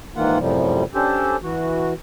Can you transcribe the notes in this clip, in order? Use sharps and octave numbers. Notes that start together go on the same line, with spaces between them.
G#2 D#3 E3 A#3 F4 F#5
F#2 A2 C3 F3 G3
C#4 D4 G4 A4 C5
E3 F#4